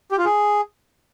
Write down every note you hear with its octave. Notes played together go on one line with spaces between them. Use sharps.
G4
F4
G#4